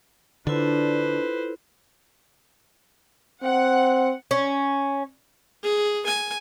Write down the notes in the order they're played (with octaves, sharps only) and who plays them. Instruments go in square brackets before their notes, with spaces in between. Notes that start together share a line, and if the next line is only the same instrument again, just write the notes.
[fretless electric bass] D3 [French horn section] D4 [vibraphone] E4 F4 A4 [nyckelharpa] B4 C5
[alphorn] C4 [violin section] F#5
[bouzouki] C#4
[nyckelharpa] G#4
G#5